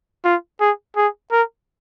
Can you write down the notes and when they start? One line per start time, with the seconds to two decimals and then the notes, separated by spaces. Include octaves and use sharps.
0.25 F4
0.60 G#4
0.97 G#4
1.31 A#4